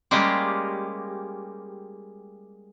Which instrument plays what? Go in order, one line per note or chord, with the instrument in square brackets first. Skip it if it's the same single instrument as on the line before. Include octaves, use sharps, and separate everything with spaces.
[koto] G3 G#3 A#3 C#4 F4 G4